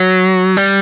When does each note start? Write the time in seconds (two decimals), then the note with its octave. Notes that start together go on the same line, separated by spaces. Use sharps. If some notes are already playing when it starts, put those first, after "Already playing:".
Already playing: F#3
0.57 G3